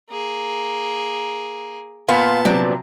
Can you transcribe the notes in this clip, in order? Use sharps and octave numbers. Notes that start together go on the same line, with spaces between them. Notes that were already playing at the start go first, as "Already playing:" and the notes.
A#3 G#4
A#2 B3 F5 A5 C6
C3 F3 F#3 D4